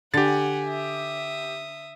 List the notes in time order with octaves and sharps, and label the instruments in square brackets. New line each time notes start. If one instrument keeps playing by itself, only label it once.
[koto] D3 [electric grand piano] G4 A6 [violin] F#5 G#5
[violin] E5 D#6